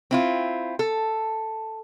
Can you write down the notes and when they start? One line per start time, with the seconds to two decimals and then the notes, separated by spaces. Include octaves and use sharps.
0.11 C4 E4 F4
0.79 A4